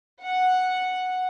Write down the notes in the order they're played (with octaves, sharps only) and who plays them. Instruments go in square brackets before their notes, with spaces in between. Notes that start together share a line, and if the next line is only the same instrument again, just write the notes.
[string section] F#5